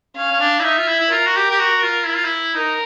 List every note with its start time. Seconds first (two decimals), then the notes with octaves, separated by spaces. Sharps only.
0.16 C#4 F5
0.32 C#4
0.40 D4
0.60 E4
0.63 D#4 E5
0.78 F4
0.88 E4
1.00 E4
1.11 F4 A#4
1.27 F#4
1.36 G4
1.50 G4
1.59 F#4
1.83 F4
2.06 E4
2.16 F4
2.24 E4
2.55 D#4 A#4